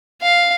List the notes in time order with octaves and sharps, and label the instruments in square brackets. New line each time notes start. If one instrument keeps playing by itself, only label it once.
[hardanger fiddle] F5